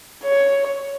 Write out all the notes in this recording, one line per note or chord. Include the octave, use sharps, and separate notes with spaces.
C#5